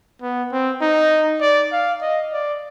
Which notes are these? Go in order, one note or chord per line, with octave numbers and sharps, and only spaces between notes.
B3
C4
D#4
D5
F5
D#5
D5